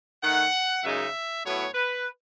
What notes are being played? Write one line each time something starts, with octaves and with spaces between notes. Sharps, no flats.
D#3 A3 D#4 F#5
F#2 C#3 G#3 D#4 E5
A2 F#3 B3 E4 C#5
B4